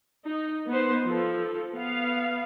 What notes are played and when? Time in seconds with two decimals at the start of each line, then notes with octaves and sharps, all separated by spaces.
0.25 D#4
0.68 B3 D#4 C5
1.05 F3 A4
1.75 B3 F5